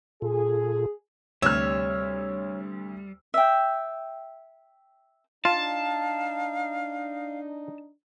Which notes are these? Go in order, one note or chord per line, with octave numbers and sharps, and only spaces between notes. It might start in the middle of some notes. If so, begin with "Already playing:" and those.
A#2 F4 G#4 A4
D2 C3 G3 C#5 E6 F6 E7
E5 G5
D4 D#4 F4 F5 A5